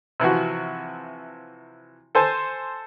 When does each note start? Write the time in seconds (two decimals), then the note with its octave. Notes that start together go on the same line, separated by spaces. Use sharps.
0.20 C3 E3 F3 F#4
2.15 A4 C5 G#5 A5